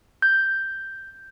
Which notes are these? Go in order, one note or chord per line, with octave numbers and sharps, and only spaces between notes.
G6